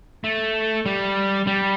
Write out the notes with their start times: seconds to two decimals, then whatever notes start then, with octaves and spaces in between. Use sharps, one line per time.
0.24 A3
0.86 G3
1.47 G3